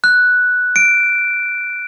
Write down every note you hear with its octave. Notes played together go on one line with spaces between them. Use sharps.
F#6
D7